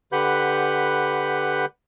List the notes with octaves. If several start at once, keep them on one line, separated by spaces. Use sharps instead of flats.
D3 G4 B4 F#5 B5 G6